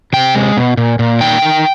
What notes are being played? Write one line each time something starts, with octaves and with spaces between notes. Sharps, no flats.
C3 G5
G#3
B2
A#2
A#2
D#3 G5
D#3